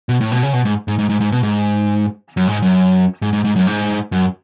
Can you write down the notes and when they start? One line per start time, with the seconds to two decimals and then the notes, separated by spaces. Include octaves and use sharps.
0.09 B2
0.21 A2
0.32 B2
0.43 C#3
0.53 B2
0.65 G#2
0.88 G#2
0.99 G#2
1.09 G#2
1.21 G#2
1.32 B2
1.43 G#2
2.37 F#2
2.47 G#2
2.62 F#2
3.22 G#2
3.33 G#2
3.45 G#2
3.56 F#2
3.67 G#2
4.12 F#2